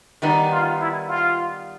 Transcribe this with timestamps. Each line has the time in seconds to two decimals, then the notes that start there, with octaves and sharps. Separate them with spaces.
0.22 D#3 G3 B3 D#4
0.51 F4
0.80 E4
1.08 F4